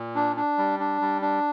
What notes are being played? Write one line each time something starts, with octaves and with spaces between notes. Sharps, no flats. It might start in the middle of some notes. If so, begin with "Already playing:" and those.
Already playing: A#2
D4
D4
G3
D4
G3
D4